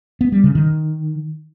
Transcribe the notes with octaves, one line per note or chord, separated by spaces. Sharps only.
B3
G3
C#3
D#3